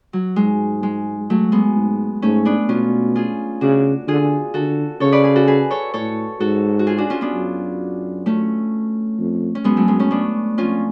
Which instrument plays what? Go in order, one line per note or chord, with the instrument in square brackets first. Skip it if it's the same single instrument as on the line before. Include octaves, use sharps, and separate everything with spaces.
[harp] F#3
[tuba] G#2 [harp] G#3
[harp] G#3
F#3 A3
G#3 B3
[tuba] G#2
[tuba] G#2 [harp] A3 C#4
[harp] B3 D4
[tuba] B2 [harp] C#4 F4
[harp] F4 G#4
[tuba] C#3 [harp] D4 F#4
[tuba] D3 [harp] F4 G#4
[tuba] D3 [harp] F#4 A4
[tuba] C#3 [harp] A4 C#5
[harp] B4 D5
G#4 B4
F#4 A4
G#4 B4
A4 C#5
[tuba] A2 [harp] A4 C#5
[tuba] G#2 [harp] F#4 A4
[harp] F#4
F4 G#4
D4 F#4
C#4 F4
B3 D4
[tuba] F#2
[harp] A3 C#4
[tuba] F2
[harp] C#4
[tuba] F#2 [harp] G#3 B3
[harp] F#3 A3
G#3 B3
A3 C#4
B3 D4
[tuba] F2 [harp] C#4 F4